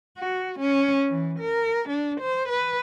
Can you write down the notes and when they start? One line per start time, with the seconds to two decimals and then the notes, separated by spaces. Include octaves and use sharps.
0.18 F#4
0.60 C#4
1.09 E3
1.40 A#4
1.89 D4
2.21 C5
2.49 B4